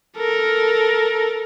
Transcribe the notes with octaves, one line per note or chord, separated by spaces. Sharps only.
A4 A#4